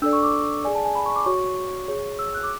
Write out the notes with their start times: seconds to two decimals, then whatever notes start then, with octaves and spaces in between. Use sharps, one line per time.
0.02 D4 A4 D5 E6
0.13 C#6
0.23 D6
0.64 G#4 D5 G#5
0.75 A5
0.85 G#5
0.95 B5
1.06 C#6
1.16 D6
1.26 F#4 C#5 C#6
1.88 G#4 C#5
2.19 E6
2.34 F#6
2.43 D6